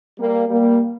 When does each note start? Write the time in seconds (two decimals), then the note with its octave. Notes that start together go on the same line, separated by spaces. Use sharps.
0.20 G3 A#3
0.48 G3 A#3